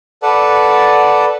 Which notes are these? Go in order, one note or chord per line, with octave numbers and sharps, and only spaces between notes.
A4 B4 D5 F#5 A5